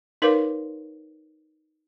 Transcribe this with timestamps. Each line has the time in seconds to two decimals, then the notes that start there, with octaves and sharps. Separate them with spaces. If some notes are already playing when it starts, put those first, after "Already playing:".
0.22 D#4 A#4 B4 C#5 F5 D6